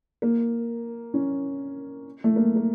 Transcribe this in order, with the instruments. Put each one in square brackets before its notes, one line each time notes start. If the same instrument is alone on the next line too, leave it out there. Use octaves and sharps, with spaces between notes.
[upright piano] A#3
C#4
A3
A#3
A#3